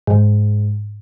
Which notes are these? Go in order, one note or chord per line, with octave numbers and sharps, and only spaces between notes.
G#2